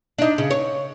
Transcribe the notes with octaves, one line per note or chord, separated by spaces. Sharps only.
D4 D#4
C#3
C#5